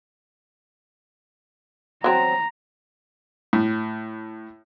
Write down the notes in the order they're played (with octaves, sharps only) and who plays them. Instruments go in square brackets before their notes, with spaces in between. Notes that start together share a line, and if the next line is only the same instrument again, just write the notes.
[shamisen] F#3 C4 [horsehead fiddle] A#5
[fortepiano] A2